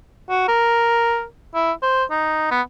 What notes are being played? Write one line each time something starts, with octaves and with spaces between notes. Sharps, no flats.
F#4
A#4
E4
C5
D#4
B3